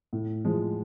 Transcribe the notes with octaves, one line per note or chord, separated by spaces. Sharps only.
A2
F3 G#3